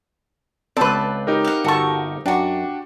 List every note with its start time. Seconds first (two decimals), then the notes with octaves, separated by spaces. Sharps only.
0.77 C#2 C4 A4 B4 D5 A5
1.27 D#4 G4 A#4
1.44 F5 F#5
1.64 G1 F#4 A4 A5 C#6
2.26 F#2 D4 F#4 G4